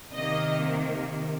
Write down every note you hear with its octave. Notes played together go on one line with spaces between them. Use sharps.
C3 D#3 A#3 D#5